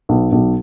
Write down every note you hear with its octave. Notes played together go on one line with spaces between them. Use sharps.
B1
B1